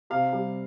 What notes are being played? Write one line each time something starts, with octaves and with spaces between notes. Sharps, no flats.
C3 F5
G3